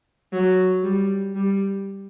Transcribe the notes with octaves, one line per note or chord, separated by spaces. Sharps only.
F#3
G3
G3